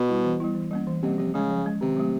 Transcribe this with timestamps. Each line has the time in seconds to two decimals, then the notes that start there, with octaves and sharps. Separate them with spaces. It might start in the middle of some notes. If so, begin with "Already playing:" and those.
Already playing: B2
0.08 G3 B3 E4
0.24 E3
0.40 G3 B3 E4
0.55 E3
0.71 G3 A#3 C#4
0.87 E3
1.03 C3 G3 A#3 C#4
1.18 C3 F3
1.34 C#3 G#3 C#4
1.50 F3
1.66 G#3 C#4
1.81 C3 D#3
1.97 F#3 A3